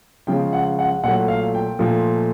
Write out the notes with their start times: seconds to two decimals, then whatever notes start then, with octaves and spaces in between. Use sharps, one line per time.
0.27 C#3 F3 G#3 G5
0.53 F#5
0.79 F#5
1.04 A#2 F#3 A3 F#5
1.28 F5
1.54 G5
1.79 A#2 F3 A3